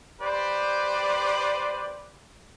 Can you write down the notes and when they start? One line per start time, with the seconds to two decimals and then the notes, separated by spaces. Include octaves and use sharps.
0.21 G4 B4 C5 D5